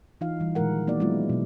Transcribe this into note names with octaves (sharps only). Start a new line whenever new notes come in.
E3 D#4 F4 F5
E3 G3
A#2 D#3 F3 G#3 A#4 F#5
A#3 B3 D#4 F#4 D5
F#3 G#3 B3 D4 E4 F4
B2 F#3